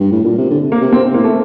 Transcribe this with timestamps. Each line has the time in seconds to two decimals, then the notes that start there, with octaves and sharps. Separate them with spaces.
0.00 G2
0.12 A2
0.24 A#2
0.38 C3
0.50 D3
0.72 A#3
0.82 C3
0.93 C4
1.14 A2 A#3
1.24 A3